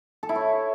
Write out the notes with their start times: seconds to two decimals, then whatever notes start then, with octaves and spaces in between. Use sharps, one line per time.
0.23 A4
0.29 E4
0.35 C#5